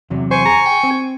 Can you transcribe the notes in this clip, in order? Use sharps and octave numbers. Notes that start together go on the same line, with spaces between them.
E2 C3 F#3
C5 G#5 C#6
G#4 A#5
G5
C4